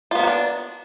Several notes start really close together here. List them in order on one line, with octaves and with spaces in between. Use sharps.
F4 B3 A#3 F#4 D4